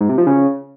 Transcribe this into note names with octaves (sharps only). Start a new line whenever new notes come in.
G#2
C3
F3
C#3